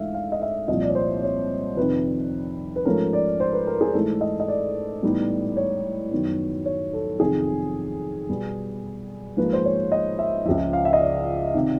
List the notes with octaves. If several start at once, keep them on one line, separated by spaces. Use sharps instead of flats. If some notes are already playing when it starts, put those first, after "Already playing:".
Already playing: G#2 E3 A3 D4 E5 F5
F5
D#5
E5
C2 A#2 F3 D#5
D5
C#5
C5
C#5
F2 C3 D#3 B4
B4
G#2 F3 A3 C#4 A#4
D5
C5
B4
A#4
G#4
G#2 E3 A3 A4
D#5
D#5
D5
A2 E3 G3 B3 D#4
C#5
F#2 D#3 F#3 B3
C#5
A4
F2 C3 D#3 G#4
B2 G3 B3
G#2 F3 A#3 B4
C5
C#5
D#5
E5
C#2 C#3 F3 E5
F5
E5
D#5
D5
C3 D#3